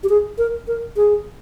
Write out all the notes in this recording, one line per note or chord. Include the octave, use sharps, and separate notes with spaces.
G4
G#4
A#4
A#4
G#4